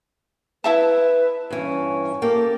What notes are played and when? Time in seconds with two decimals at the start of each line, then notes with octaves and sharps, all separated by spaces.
0.64 E4 B4 E5 A5
1.50 G2 E3 C#4
2.22 A#3 G4 A4